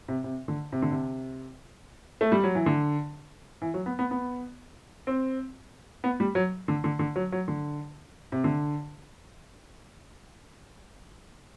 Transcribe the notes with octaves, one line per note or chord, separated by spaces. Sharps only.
C3
C3
D3
C3
D3
C3
A3
G3
F#3
E3
D3
E3
F#3
B3
B3
B3
C4
B3
G3
F#3
D3
D3
D3
F#3
F#3
D3
C3
D3